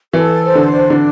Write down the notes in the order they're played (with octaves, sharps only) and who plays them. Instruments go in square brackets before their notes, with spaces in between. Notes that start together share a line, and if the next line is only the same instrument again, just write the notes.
[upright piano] E3 [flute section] A4
[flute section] C5
[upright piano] D3
[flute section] D4
[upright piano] D3